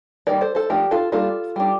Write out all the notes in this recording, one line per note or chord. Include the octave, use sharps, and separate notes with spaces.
D#3 G3 A#3 A#4 D5
A4 C5
A4 C5
F3 A3 D4 G4 A#4
F4 A4
G3 A#3 D4 F4 A4
G3 D4